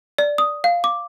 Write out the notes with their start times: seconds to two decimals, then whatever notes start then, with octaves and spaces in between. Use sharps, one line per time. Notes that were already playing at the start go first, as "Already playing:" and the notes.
0.18 D5
0.38 D#6
0.64 F5
0.84 D6